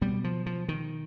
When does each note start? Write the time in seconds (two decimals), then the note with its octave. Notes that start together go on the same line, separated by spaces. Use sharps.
0.01 B2 G3
0.24 F3
0.46 F3
0.69 D#3